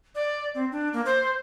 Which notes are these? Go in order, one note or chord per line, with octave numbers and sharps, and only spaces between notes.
D5
C4
D4
A#3
C5